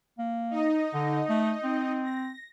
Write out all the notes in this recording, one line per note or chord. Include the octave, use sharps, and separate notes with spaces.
A#3
D#4 D#5
D3
A3
C4
A#6